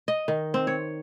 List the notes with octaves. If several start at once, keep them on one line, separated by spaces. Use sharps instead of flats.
D#5
D#3
C4
C#5